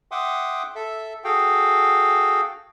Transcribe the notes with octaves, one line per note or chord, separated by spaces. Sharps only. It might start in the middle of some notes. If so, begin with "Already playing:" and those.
E5 F#5 G5 C6 D6 D#6
A4 E5
F#4 G#4 A4 F5 G5